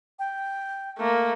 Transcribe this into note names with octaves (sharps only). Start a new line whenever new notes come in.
G5
A3 A#3